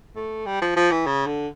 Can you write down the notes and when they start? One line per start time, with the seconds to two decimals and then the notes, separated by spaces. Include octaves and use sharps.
0.16 A3
0.46 G3
0.62 F3
0.77 F3
0.91 E3
1.07 C#3
1.27 D3